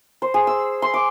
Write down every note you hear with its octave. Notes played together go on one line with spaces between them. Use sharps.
C5
G#4
E6
C6
D6